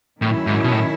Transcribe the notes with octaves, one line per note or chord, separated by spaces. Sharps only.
A2 D#3 F#3 C#4 E4
G#2
B2
A2